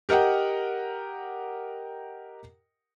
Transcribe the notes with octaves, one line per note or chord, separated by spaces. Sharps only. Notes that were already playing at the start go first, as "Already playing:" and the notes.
G4 A#4 D#5 F#5 G5